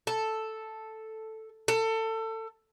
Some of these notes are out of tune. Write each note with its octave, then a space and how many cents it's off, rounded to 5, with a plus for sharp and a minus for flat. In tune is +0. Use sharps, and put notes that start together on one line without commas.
A4 +0
A4 +25